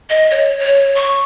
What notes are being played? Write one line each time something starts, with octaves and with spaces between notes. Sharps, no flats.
D#5
C#5
C#5
C#6